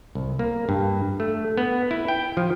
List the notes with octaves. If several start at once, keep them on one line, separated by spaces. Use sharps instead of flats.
C2
A#3
G2
A3
B3
E4
G5
F3